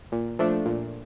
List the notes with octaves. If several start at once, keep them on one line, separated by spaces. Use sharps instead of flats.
A#2
F3 A3 D4
A#2